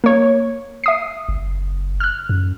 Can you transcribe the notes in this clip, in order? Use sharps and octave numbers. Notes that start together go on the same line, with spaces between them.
A#3 C#5
E5 D#6 C7
F#1
F6 F#6
F#2